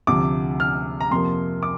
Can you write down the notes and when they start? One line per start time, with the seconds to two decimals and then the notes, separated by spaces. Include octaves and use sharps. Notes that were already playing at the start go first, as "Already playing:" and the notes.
0.07 D2 C3 F3 D6
0.60 F6
1.01 A#5
1.11 F2 C3 F3 A#3 C6
1.63 D6